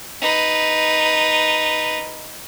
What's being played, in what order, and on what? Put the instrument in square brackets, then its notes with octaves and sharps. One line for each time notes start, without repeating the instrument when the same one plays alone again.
[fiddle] D#4 B4